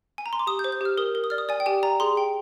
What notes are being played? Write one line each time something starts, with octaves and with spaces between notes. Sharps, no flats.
G#5
A#5
C6
D6
G4 D#6
G6
C5
G6
G4 F6
A#4 D#6
A#4
D#6
D5 F6
D#6
D5 G#5
G5
G4 G#5
D5 A#5
G#4 C6
G5